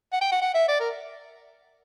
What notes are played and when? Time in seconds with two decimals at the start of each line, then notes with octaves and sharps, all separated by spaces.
0.12 F#5
0.21 G5
0.31 F#5
0.41 F#5
0.54 E5
0.68 D5
0.80 A#4